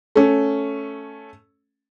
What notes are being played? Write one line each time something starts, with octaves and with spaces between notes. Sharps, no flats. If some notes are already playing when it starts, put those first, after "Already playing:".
A3 C#4